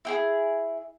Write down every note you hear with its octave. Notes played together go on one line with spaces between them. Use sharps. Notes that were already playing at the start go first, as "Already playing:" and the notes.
E4 G4 G#4